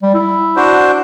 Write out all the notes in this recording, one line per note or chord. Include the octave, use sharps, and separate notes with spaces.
G3
E4
D4 F#4 C5